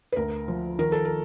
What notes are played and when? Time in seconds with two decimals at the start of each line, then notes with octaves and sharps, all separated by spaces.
0.12 B4
0.16 D2 A#4
0.48 F3
0.79 D#3 A#4
0.92 A4
1.05 A#4